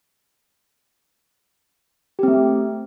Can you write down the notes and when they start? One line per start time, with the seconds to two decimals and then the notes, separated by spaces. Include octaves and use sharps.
2.19 G4
2.23 C4
2.28 A3